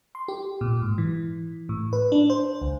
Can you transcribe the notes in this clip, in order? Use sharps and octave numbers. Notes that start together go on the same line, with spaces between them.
C6
G4
A#2
G#2
E3
A2
B4
D4
C5
C#2